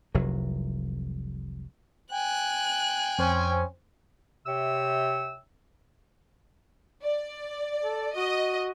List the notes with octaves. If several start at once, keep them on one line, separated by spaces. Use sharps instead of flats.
F1 C2 F#3
G5 G#5 F#6
F2 C4 C#4 C5
C3 C#5 E5 G5 E6
D5
A4
F#4 D#5